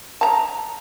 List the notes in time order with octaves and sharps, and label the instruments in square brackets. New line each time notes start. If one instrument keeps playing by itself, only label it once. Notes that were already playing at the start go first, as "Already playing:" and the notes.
[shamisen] A5 A#5